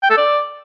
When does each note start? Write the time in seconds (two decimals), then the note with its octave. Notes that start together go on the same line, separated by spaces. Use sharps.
0.03 G5
0.10 A4
0.17 D5